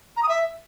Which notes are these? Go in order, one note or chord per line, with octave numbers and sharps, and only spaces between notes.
A#5
D#6
E5